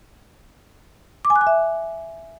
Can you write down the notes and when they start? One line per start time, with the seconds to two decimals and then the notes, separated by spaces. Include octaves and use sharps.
1.25 D6
1.30 G#5
1.36 F#6
1.41 G#5
1.47 E5